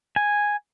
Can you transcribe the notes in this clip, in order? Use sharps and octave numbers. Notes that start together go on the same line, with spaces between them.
G#5